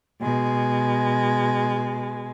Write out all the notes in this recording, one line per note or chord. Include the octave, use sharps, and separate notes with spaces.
B2 G#3